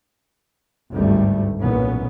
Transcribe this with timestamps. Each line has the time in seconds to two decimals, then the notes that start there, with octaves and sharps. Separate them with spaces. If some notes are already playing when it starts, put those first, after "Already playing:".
0.93 G#1 D2 G2 G3 A3
1.59 B1 A#2 E3 B3 C#4